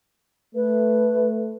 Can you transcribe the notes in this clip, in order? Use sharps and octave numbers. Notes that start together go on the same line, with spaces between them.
A3 B4